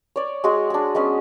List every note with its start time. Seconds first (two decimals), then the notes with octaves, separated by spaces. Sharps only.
0.16 C#5 D5
0.44 G#3 F#4 G#4
0.70 D4 G#4
0.95 G#3 B3 C#4